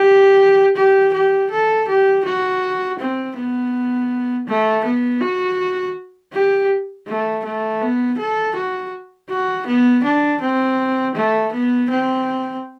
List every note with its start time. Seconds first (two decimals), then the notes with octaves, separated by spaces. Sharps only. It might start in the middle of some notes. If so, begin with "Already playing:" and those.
Already playing: G4
0.76 G4
1.14 G4
1.51 A4
1.88 G4
2.25 F#4
2.99 C4
3.36 B3
4.47 A3
4.85 B3
5.21 F#4
6.33 G4
7.07 A3
7.45 A3
7.81 B3
8.18 A4
8.56 F#4
9.30 F#4
9.67 B3
10.04 D4
10.41 C4
11.15 A3
11.53 B3
11.90 C4